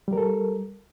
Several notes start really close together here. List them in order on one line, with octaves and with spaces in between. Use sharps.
G3 A#4 A4